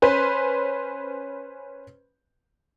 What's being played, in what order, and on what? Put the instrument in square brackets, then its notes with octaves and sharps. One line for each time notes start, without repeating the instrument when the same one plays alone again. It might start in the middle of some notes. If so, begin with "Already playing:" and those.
[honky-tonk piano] C#4 B4 C5